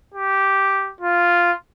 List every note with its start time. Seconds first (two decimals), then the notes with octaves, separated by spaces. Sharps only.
0.14 G4
1.01 F4